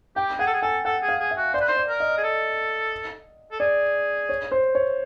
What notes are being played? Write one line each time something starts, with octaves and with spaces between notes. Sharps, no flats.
G4 G5
G#4 F#5
A4
G#4
A4 G#5
A4 F#5
G#4
F5
G#4
E5
F#4
C5 D5
B4
C5
D5
A#4
D#5
G#4
A4
A4
G#4 D5
C#5
C5
C#5